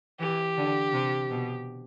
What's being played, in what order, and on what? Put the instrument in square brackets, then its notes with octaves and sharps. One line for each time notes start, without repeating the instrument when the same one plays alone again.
[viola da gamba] E3 [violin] G4
[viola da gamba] D3
C3
B2